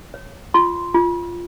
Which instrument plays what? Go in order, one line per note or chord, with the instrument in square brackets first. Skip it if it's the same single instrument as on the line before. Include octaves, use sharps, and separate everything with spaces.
[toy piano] C#5
F4 C6
F4